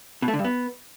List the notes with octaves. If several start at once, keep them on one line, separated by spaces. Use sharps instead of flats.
B2
A3
D3
G2
B3